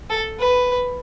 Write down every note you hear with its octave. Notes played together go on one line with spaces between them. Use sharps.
A4
B4